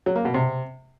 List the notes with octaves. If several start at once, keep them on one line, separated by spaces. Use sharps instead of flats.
F#3
A#3
B2
C3